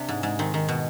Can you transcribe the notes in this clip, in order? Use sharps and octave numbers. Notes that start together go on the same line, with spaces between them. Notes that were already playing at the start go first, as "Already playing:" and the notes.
Already playing: C3 D4
G#2
G#2
D#3 C4
D#3
B2